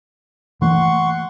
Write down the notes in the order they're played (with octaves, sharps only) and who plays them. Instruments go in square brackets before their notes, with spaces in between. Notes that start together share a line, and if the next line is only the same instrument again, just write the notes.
[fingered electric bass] E3 A3 A#3 [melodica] F#5 C6 C#6